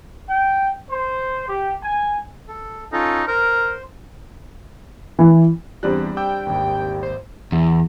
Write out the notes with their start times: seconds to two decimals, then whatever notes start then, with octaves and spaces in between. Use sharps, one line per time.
0.29 G5
0.91 C5
1.48 G4
1.84 G#5
2.48 A4
2.93 C#4 D#4 F4 A4
3.28 A#4 C5
5.19 E3
5.83 E2 G3 C4 D4 D5 F#6
6.17 G5 D6 E6 G6
6.47 G#1 D#2
7.03 C5
7.52 E2